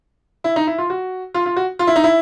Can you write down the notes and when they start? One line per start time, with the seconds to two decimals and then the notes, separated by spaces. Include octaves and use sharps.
0.44 E4
0.56 D#4
0.67 E4
0.78 F4
0.90 F#4
1.34 F4
1.46 F4
1.56 F#4
1.79 F4
1.87 E4
1.96 D#4
2.04 E4